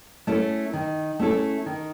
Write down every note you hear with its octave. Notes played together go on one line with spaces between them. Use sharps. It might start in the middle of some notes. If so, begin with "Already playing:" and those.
A3 C#4 E4 A4
D#3
A3 C#4 E4 A4
D#3